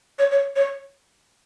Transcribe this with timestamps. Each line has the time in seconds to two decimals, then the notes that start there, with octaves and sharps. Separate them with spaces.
0.19 C#5
0.31 C#5
0.56 C#5